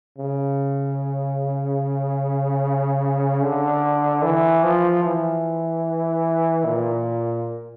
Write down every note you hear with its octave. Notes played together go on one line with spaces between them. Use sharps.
C#3
D3
E3
F3
E3
A#2